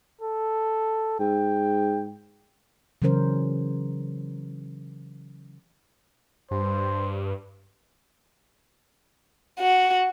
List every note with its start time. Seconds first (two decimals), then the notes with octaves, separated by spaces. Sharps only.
0.21 A4
1.20 G#2 G5
3.02 C#3 E3 F#3 C#4 A#4 C5
6.51 G2 C5
9.59 F#4